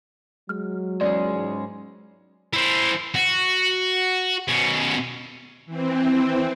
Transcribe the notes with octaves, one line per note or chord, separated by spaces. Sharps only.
F#3 G#3 F6
E2 G#3 C#4 G#4 D5
G#2
E4 C5
F#4
B2 C#4
E3 C4